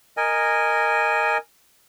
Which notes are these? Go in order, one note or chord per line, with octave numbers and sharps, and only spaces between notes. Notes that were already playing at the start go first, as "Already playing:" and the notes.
A#4 D#5 G#5